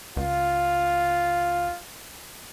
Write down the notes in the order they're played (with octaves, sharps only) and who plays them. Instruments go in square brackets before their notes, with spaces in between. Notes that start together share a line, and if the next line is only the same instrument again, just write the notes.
[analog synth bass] C#2 [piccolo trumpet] F4